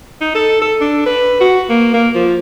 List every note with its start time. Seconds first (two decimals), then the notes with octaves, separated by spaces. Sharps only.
0.21 D#4
0.35 A4
0.61 A4
0.81 D4
1.06 B4
1.40 F#4
1.69 A#3
1.93 A#3
2.15 F3